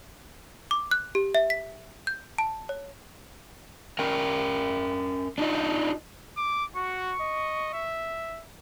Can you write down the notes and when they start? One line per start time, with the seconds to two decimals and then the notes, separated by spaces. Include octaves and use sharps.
0.71 D6
0.91 F#6
1.15 G4
1.35 E5
1.50 B6
2.07 G6
2.38 A5
2.69 C#5
3.99 C#4 A#4 G5
5.38 D4 D#4 F4 D#5
6.37 D6
6.76 F#4 C#6
7.21 D#5
7.73 E5